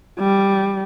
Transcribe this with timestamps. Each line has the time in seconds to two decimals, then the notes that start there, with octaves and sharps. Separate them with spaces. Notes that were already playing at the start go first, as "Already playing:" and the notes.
0.20 G3